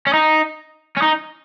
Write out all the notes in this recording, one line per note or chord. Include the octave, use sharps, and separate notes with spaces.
C#4
D#4
C#4
D#4